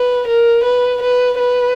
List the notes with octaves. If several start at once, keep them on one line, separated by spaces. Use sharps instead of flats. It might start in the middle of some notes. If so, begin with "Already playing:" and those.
Already playing: B4
A#4
B4
B4
B4